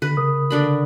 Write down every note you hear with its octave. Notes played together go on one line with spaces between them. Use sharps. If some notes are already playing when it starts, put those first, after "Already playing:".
D3 B4
C#3 A#4 D#6
D3 D4 B5